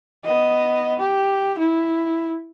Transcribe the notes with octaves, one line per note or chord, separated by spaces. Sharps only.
B3 D#5
G4
E4